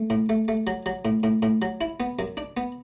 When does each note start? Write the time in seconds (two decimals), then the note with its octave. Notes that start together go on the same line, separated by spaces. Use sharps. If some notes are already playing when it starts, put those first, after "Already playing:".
Already playing: A3
0.10 A2
0.29 A3
0.48 A3
0.67 F#3
0.86 F#3
1.05 A2
1.23 A2
1.42 A2
1.62 F#3
1.81 E4
2.00 B3
2.19 F#2
2.37 D4
2.57 B3